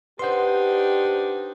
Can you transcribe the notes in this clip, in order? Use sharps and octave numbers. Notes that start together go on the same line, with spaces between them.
D4 D#4 G4 B4 C5 F#5 C6